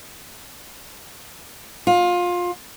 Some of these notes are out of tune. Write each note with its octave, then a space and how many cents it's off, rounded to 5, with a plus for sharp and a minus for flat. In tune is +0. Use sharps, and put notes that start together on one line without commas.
F4 +20